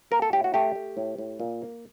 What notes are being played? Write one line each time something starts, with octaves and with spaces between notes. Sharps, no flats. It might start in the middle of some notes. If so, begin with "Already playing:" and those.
A#3 A#4
A4
A2 G4
F#4
A3 G4
A3
A2
A2
A#2
A#3